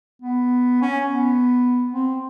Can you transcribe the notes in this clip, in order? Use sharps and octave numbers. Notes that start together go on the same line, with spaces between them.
B3
C#4
B3
C4